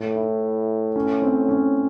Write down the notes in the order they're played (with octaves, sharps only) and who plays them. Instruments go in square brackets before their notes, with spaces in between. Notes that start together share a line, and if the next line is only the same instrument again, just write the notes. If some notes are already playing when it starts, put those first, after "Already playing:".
Already playing: [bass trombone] A2
[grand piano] E4
C#4
C4
C#4